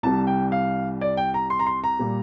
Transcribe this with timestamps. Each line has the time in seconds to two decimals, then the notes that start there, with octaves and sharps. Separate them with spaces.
0.03 C2 C3 G3 A5
0.27 G5
0.52 F5
1.01 D5
1.17 G5
1.34 A#5
1.50 C6
1.59 A#5
1.66 C6
1.84 A#5
1.99 A#2 G3